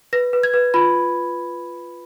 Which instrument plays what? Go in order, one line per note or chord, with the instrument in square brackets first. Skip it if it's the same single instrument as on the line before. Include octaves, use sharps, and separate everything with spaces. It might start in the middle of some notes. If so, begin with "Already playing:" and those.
[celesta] B4 A#6
B4
G#6
B4
F4 B5